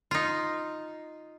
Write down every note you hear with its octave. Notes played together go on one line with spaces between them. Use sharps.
D#4 F4